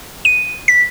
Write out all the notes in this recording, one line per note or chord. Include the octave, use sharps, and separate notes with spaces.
D#7
B6